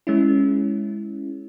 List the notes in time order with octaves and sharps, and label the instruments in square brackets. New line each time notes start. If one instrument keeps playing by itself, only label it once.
[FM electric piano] G#3 C#4 E4